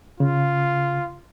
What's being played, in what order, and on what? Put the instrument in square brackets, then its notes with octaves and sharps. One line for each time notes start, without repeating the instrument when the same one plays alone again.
[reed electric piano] C#3 [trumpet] F4